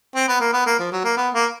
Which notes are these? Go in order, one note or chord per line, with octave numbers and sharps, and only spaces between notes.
C4
B3
A#3
B3
A#3
F3
F#3
A#3
B3
A#3